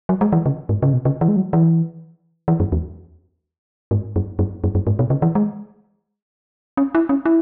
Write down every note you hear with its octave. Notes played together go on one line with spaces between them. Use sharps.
F#3
G#3
E3
C#3
G#2
C#3
B2
C#3
E3
G#3
F#3
E3
E3
F#2
E2
G#2
F#2
F#2
F#2
F#2
G#2
B2
C#3
E3
G#3
C#4
E4
C#4
E4